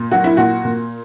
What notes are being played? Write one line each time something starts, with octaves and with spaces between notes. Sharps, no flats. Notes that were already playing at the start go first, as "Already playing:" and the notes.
Already playing: A#2
F#3 F#4
E4
A#2 F#4
A#2